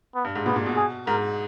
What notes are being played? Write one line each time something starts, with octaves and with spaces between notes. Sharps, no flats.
B3
G2
G#2
A#2 B3
A#2
B2
G#4
G#2 A#4